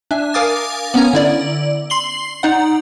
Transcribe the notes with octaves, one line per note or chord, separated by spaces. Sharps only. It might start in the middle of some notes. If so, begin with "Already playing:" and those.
D4 E5 G#5
A#4 F5 G#5 D6 D#6 A6
B3 C#4 G#5 A#5 G#6
D3 E4 D5
C6 C7 F#7 G7
D#4 D5 F#5